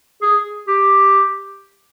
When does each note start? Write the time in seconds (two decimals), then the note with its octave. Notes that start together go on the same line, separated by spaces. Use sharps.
0.22 G#4
0.67 G4